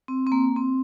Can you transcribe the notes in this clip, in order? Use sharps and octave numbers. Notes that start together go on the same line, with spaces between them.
C4
C4
A#3
C4